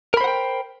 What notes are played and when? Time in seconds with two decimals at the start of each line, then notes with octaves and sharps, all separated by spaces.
0.14 A#4
0.17 B5
0.21 C5
0.24 F#5
0.28 G5